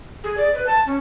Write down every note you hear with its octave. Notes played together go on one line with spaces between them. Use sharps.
G#4
D5
B4
A5
C#4